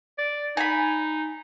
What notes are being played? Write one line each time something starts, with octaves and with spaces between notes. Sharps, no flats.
D5
D#4 G#5 B5